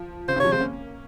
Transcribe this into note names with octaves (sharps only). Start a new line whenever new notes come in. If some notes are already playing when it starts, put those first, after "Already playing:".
Already playing: F3
C#3 C5
C3 D#3
C#3 F3 C#5
G#3 C4 C5
A#3 C#4